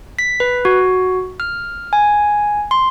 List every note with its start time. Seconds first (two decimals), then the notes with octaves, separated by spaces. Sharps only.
0.19 B6
0.40 B4
0.65 F#4
1.40 F6
1.93 G#5
2.71 C6